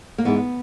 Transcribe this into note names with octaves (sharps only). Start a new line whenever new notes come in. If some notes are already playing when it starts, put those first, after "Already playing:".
A#3
G#2 E3 G#3 B3